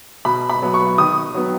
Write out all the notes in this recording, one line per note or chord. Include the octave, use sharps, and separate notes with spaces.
B2 B5
B5
F#3 B3
C#6
D#3 D#6
F#3 B3